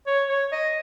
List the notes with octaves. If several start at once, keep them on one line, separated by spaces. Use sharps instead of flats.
C#5
C#5
D#5